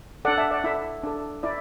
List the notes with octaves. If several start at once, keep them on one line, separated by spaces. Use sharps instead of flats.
D4 A4 D5 F#5
E5 A5
D5 F#5
E4 A4 E5
D4 A4
E4 D5